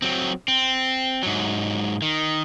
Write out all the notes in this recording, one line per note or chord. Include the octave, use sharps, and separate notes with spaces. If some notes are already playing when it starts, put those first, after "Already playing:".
F#3 C4
C4
G#2 F#3
D#3